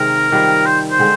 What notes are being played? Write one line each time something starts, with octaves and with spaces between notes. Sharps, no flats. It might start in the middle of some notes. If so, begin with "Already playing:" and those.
Already playing: C3 D#3 G#3 D#4 A#4
D#3 G3 C4 F4
C5
C5
D3 G#3 C4